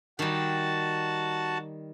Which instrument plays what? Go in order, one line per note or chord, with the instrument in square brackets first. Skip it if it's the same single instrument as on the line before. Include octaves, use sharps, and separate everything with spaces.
[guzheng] D#3 G3 [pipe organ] F#4 A5